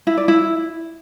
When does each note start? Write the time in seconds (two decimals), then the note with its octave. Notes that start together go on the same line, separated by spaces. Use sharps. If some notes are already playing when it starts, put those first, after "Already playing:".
0.07 E4
0.17 D5
0.28 E4